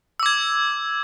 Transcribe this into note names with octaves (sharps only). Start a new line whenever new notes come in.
D6 E6 G#6